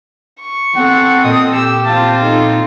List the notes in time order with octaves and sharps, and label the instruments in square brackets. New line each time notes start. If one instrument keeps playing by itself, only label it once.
[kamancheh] C#6
[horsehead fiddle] C4 A4 [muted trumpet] F#5
[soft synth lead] A#2 [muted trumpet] D#5 [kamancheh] D#6
[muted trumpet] G4 [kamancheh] E6
[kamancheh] C4 F4 [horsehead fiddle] A5
[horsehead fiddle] D#4 A4